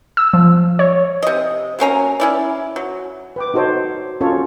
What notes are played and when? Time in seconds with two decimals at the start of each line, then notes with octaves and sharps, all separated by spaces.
0.17 E6
0.33 F3
0.79 C#5
1.23 C3 D#5
1.79 F#3 A#3 C#4 A#5
2.20 C#4 E4 D5
2.76 F#3
3.36 B4 G5 D6
3.54 D#4 F#4 A4 C5 C#5
4.21 C#4 F4 F#4 A4 C#5